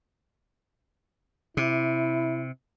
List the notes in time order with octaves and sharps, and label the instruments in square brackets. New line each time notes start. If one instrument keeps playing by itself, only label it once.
[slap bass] C3 [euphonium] E4